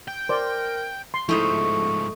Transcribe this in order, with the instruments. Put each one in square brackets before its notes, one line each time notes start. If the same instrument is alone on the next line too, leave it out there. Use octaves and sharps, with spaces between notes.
[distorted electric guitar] G5
[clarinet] A#4 [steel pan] C5 D5
[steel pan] C6
[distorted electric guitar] G#2 F3 [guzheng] A3 D#4 C5 [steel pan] E4 [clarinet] C#6